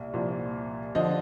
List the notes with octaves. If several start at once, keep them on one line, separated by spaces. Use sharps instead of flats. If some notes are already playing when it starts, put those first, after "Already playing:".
Already playing: C2 A#2 D5
C2 A#2 F3
D3 F3 D#5